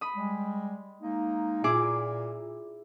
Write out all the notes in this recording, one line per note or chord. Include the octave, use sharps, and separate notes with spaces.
B5 D#6
G3 G#3
G#3 A#3 D#4
A#2 E4 G#4 D6